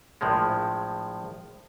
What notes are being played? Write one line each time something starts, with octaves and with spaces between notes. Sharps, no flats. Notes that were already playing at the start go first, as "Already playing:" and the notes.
A#1 A2 F3 G#3